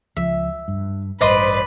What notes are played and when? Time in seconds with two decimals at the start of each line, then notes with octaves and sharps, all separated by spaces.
0.17 C#2 F3 E5
0.68 G2
1.21 A1 G2 B4 C5 D5 D#5 B5 C6